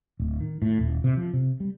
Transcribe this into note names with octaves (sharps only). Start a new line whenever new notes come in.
D1
D#3
A2
D#1
C3
F3
C3
G3